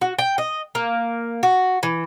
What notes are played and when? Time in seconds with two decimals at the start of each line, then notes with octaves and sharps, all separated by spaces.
0.01 F#4
0.19 G5
0.38 D#5
0.75 A#3
1.43 F#4
1.83 E3